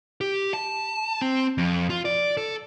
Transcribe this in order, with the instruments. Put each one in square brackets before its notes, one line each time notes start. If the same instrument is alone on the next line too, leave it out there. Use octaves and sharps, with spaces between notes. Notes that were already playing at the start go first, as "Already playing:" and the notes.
[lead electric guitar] G4
A5
C4
F2
F4
D5
A4